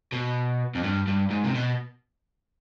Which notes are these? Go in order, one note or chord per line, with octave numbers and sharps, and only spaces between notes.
B2
F2
G2
G2
G#2
C3
B2